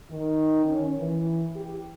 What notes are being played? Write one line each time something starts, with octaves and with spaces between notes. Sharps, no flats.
D#3
C#4
E3
G4